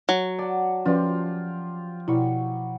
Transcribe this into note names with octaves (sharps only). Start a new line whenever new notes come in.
F#3
D5 F#5 A5
F3 C#4 F4 G4 B4 D5 C6
B2 F#3 G3 E4 C#6